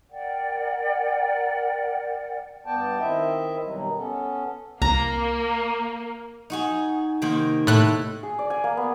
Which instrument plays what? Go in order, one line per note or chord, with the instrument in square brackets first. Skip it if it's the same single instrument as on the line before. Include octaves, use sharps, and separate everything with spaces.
[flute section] A#4 D5 F#5 G5
[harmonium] G2 B3 D5 G5 A5
D#3 C4 E4 D#5 E5
B2 D#3 F#3 G3
B3 C#4 A4
[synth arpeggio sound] C2 [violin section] A#3 [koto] A#5
[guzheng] D#4 F#4 G#4
C3 D#3 A#3
[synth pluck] A2 F#6
[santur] G#4
D5
G#5
A#3
B3